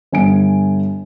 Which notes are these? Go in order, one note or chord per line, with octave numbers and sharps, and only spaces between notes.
G1 G#5 D7